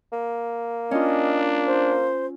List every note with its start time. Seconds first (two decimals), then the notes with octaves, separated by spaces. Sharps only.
0.13 A#3
0.91 C#4 D4 F4 D#5
1.66 C5